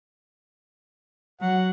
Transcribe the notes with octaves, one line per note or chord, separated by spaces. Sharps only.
F#3 F#5